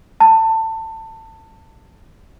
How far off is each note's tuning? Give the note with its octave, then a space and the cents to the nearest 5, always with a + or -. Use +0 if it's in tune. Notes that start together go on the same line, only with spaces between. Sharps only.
A5 +25